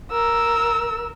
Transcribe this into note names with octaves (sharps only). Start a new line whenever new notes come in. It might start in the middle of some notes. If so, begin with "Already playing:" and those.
A#4 E6